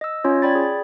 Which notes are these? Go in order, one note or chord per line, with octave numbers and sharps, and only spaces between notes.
D#5 E6
C#4 F4 C#5
D5 G5 B5 G#6 A6
G#4